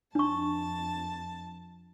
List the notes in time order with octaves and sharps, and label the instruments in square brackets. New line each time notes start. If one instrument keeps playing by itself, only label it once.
[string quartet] F2 A5 [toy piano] D4 C#6